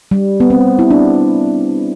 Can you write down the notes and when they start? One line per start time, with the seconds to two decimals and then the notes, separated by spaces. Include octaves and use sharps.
0.11 G3
0.40 B3
0.50 C4
0.79 E4
0.90 D4